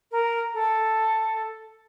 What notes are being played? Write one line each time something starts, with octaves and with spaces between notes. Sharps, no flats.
A#4
A4